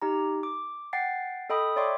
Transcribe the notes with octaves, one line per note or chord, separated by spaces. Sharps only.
D#4 G4 A#5
D6
F#5 G5 A6 C7
A4 D#5 G5 B5 D#6
C#5 D5 E5 G5 C6 D6